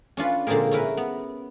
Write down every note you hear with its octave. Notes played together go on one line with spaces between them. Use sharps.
C#4 D4 F4 B4
A#2 D3 G#3 C4 G#4 A#4
C#4 E4 A#4 B4
B3